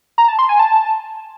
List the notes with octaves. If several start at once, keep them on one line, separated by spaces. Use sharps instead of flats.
A#5
A5
C6
G#5
A5